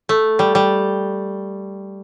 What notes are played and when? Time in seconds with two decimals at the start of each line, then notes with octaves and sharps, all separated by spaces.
0.09 A3
0.39 G3
0.55 G3